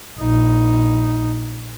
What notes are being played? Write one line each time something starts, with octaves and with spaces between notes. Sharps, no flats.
A#1 D#4